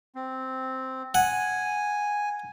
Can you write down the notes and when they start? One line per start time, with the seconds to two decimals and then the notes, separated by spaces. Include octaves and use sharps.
0.15 C4
1.15 F#5 G#5